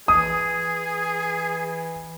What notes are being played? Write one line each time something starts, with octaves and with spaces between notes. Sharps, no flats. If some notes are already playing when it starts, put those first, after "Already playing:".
E3 G#4 D#6